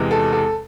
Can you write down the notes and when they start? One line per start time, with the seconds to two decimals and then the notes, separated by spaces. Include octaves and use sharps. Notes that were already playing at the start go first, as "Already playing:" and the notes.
Already playing: E2 C3 E3 G#3
0.11 A4
0.32 A4